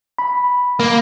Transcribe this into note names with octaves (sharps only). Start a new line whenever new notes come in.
B5
A#3